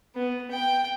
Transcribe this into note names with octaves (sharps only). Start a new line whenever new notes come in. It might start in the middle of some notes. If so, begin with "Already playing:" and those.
B3
G5